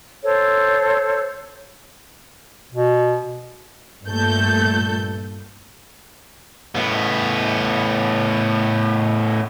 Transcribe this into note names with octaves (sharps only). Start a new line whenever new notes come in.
A4 C5 C#5
B2
G2 A#2 A3 A4 G6
A2 B3